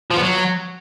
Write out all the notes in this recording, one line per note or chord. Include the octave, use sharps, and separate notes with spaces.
F3
B3
F#3